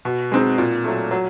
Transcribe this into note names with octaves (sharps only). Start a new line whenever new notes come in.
B2
G#3 C4 D#4
A#2
F#3 A3
F#3